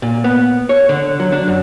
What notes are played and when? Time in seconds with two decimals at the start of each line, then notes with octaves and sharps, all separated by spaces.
0.02 A#2
0.24 B3
0.69 C#5
0.89 D3
1.20 F#3
1.32 D4
1.48 F#2